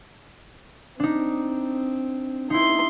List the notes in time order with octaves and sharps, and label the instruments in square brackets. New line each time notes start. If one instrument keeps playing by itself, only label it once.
[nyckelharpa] C4 [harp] D4 D#4
[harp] D#4 E4 [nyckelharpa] C6